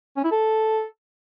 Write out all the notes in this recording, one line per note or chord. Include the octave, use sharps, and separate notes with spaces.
C#4
E4
A4